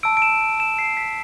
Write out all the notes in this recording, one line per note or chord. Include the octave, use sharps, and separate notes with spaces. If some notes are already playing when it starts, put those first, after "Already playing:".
A5 E6 D7
D7
E7
E7
C7
B6